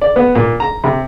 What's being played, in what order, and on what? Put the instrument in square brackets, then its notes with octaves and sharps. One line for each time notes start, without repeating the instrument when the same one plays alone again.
[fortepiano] D5
B3
A#2
A#5
C3